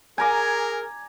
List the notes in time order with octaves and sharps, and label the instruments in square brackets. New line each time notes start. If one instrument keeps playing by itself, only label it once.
[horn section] G#4 A#4 [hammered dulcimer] G#5 A#5 D6